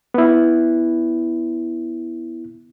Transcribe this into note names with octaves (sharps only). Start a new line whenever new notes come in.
B3 E4